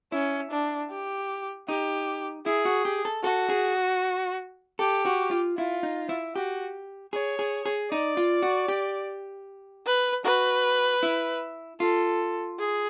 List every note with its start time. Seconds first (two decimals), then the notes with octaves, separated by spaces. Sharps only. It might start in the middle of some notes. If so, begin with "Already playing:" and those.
0.12 C#4 E4
0.51 D4
0.90 G4
1.68 D#4 G4
2.46 E4 G#4
2.65 F#4
2.85 G4
3.05 A4
3.23 F#4 A4
3.50 G#4
4.79 G4 A4
5.06 F#4
5.31 F4
5.57 E4 F4
5.83 D#4
6.09 E4
6.35 F#4 G4
7.13 G#4 C#5
7.39 G#4
7.66 G#4
7.91 D#4 D5
8.17 F4
8.43 F#4
8.68 G4
9.86 B4
10.25 F#4 B4
11.03 E4
11.80 F4 A4
12.59 G#4